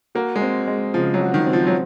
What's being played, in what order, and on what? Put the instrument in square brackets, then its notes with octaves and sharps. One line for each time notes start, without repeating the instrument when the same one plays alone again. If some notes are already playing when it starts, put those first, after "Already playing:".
[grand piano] A#3 [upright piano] F#4
[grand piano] G#3
[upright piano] C4
G#3
[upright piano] C#3 [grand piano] F3
[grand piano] F#3
[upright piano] F#4
[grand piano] D#3
[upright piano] C4
[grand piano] F3
F#3